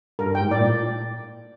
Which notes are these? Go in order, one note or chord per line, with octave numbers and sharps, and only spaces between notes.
G2 A#4
G5
G#2
A2 D5
A#2